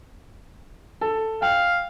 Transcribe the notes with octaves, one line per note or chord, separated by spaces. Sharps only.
A4
F5 G5